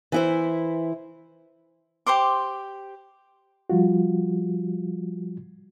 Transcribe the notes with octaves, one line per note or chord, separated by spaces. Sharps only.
E3 E4 C5
G4 C5 C6 D6
F3 G3 F4 F#4